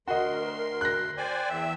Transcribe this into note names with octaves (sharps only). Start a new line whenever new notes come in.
D2 F#4 A#4 D#5 C6
A#4
F#6 A#6
C5 D5 G5 G#5
G5
E2 E5